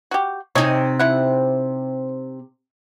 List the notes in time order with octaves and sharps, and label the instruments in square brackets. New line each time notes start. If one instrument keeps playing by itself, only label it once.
[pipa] F#4 G4
[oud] C3 D#4 [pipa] C#5 D#5 G#5
[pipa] E4 F#5